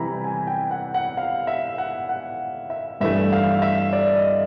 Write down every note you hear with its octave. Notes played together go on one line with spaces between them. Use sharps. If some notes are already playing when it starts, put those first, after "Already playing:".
Already playing: C3 E3 G3 A#5 B5
G#5
G5
F#5
F#5
F5
E5
F#5
F#5
E5
G2 E3 A3 E5
F5
E5
D5
D#5